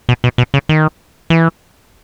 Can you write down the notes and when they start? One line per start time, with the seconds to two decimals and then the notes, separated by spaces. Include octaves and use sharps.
0.09 B2
0.24 B2
0.38 B2
0.54 C#3
0.69 D#3
1.30 E3